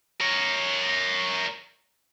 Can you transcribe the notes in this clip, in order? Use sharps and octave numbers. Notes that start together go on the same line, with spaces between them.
A#4 C#5